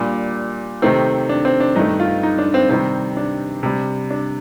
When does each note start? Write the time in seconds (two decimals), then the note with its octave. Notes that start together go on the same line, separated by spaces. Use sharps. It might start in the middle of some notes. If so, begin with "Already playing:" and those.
Already playing: A#2 G3 D4
0.82 C3 D#3 A3 C4
1.29 D4
1.45 C4
1.60 D4
1.76 G2 D#3 A3 D#4
2.00 F4
2.23 D#4
2.38 D4
2.54 C4
2.69 C3 D#3 G3 C4
3.17 D4
3.63 C3 G3
4.10 D4